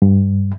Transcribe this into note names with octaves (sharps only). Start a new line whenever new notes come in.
G2